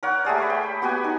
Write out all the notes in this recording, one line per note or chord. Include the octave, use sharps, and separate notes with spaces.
A#4 C#5 F#5
A3 G4 G#4 D5
C#5 B5
G5
B3 F#4 G4 G#5
D#4